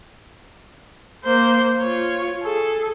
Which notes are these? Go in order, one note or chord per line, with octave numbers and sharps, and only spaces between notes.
A#3 C5
F4 C#5
G#4 A4